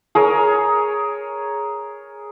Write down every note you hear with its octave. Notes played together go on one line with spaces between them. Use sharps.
G#4 A#4 C#5